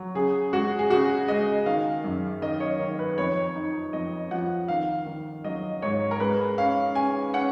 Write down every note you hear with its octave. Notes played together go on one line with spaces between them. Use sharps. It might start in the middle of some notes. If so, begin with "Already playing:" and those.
Already playing: F#3
C#3 G#4
G#3 F#4
G#4
C#3 F#4
G#3 D#5
D#3 F5
F#2
D#3 D#5
C#5
D#3
B4
F2 C#5
D#4
F2 D#5
F3 F#5
D#3 F5
D#3
F#3 D#5
G#2 C#5
A#4
G#3 B4
C#4 F5
C#4 G#5
C#4 F#5